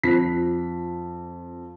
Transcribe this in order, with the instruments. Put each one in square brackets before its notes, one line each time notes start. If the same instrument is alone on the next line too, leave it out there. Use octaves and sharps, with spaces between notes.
[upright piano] F2 B6 [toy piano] F4 C5